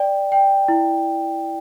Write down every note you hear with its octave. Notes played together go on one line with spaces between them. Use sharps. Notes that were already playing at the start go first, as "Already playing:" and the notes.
Already playing: D5 G5
G5
E4